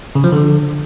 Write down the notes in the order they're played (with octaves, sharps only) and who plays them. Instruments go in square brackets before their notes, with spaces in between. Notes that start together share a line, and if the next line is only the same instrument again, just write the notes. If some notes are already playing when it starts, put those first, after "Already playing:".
[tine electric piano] C#3
F3
D3